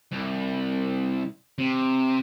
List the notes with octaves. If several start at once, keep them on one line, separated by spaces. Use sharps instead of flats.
C2
C3